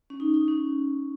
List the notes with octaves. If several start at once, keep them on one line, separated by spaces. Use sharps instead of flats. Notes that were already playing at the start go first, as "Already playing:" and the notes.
C#4
D#4
D#4
C#4